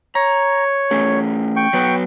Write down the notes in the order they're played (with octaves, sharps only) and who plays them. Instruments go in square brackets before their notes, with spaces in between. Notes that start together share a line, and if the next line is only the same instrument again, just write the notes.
[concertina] C#5 [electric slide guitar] A#5
[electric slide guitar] A3 C#4 G#4
[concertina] G5 C#6
[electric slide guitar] F#3 B3 B4